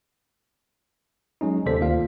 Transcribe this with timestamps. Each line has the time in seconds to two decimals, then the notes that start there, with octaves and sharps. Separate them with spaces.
1.41 F#3 G#3 C#4 D#4
1.66 D#2 C3 A4 C5 D5 B6
1.80 D2 D#3 A#3 F4 F5